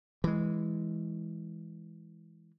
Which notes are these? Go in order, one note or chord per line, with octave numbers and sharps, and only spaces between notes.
E3 G#3